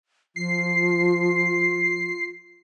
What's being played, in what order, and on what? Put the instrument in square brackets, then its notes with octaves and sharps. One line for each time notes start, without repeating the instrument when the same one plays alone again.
[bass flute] F3 [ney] F4 [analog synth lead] C7